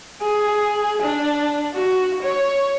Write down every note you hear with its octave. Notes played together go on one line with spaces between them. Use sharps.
G#4
D4
F#4
C#5